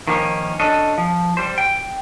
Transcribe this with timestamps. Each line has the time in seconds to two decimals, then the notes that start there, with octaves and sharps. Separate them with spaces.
0.07 D#3 F3 A#3 C#4
0.60 C#4 D4 A4 D#5
0.98 F3
1.37 G3 C5
1.58 G5